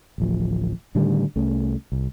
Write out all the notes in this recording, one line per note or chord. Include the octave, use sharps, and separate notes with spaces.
D1 A1 F3
A2 D3 D#3 G3
C2 A3 C#4
C2